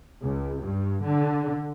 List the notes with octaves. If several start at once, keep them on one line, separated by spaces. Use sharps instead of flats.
C#2
G2
D3